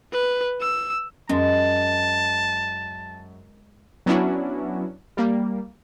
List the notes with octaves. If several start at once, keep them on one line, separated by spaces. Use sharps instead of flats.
B4
E6
F#2 G#3 A5
F#3 B3 C#4 D4 E4 F#4
G3 A#3